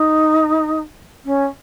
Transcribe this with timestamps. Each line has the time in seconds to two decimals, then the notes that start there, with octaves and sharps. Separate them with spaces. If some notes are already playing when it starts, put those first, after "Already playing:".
Already playing: D#4
1.25 C#4